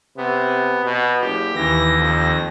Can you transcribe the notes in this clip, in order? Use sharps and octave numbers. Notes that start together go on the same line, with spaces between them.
C3 B3
B2
F#1 G4
D#2 E3 A#6
F2